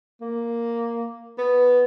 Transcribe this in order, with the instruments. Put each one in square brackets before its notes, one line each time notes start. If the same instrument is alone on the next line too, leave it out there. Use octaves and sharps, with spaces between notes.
[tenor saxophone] A#3
B3